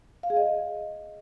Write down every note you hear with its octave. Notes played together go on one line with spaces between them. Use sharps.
F5
G#4
D#5